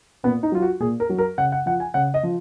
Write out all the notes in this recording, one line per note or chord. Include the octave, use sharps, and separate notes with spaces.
A#2 B3
D#4
F#3 F4
F#4
A#2 G#4
A#4
F#3
A#4
C#3 F#5
F#5
F3 F#5
G#5
C#3 F#5
D#5
F3